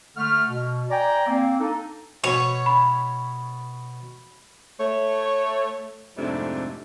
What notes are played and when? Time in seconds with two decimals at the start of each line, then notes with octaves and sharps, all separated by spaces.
0.17 D3 A3 F6
0.49 B2
0.90 D5 G5 G#5 A#5
1.27 A#3 C4
1.59 D4 D#4 A4
2.24 B2 B3 C#5
2.66 B5
4.80 A3 C#5
6.17 F2 G#2 C3 G3 A3 D4